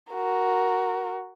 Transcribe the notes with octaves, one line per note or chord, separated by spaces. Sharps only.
F#4 A#4